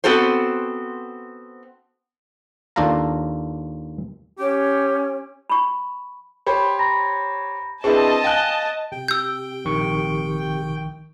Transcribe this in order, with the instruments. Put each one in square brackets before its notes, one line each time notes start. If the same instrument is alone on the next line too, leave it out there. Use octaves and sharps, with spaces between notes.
[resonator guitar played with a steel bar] B3 C4 F#4 A4 C5
[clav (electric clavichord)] D#2 D4 F4 A4 F5 A#5
[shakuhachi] C#4 [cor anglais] G4
[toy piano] B5 C#6
[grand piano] G4 C5 C#5 [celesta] B5
[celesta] A#5 B5 A#6
[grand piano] C4 D4 E4 [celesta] G#4 B4 [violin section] D#5 A5
[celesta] F5 G7 [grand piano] G5 G#5 F#6
[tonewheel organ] C3 G4 [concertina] G5
[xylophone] E6 G6
[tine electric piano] A#1 D#3 C#6